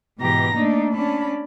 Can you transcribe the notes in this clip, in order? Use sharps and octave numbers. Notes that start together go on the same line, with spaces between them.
G#2 B2 E3 G4 A#5 A#6
A3 A#3 D4 D#4
C#4 D4 A5 B5